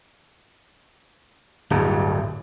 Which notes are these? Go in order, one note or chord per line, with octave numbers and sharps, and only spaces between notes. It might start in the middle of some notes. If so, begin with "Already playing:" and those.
D1 G2